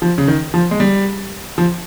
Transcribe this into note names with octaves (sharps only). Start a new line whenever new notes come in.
F3
C#3
D#3
F3
G#3
G3
F3